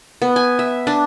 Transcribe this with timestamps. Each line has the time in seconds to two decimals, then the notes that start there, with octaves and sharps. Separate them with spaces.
0.22 B3
0.36 G#5
0.59 E5
0.87 D4